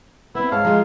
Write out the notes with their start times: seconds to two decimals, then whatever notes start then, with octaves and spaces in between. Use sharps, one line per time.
0.35 B3 C4 E4
0.52 G#2 G#4 C#5 F5 A5
0.65 F3 G#3 F4 G#4 A#5